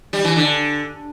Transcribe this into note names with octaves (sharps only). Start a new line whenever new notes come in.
G3
E3
D3